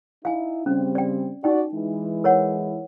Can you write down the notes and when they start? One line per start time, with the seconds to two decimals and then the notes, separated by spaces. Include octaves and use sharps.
0.25 D#4 E4 F5 G#5
0.66 C#3 G3 C4 C#4
0.95 D5 G5
1.44 D#4 F#4 D5 G5
1.74 E3 G#3 E4
2.24 A#4 C#5 F#5